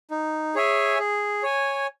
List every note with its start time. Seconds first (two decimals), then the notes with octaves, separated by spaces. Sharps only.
0.11 D#4
0.55 G#4 C#5 E5 G#5
0.99 G#4
1.43 C#5 G#5